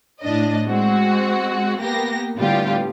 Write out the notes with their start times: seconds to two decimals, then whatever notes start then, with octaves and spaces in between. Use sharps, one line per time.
0.22 A2 D4 D#5
0.68 G#3 C4 F#4
1.79 A#3 B3 G4 A#6
2.38 A2 D3 G3 B3 F4 G4